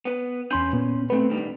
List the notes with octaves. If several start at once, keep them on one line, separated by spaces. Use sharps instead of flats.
B3 B4
E2 C#4 G#5 B5 C6 G6
A#2 B3
A3 B3 C4 B4
D2 D#3 G3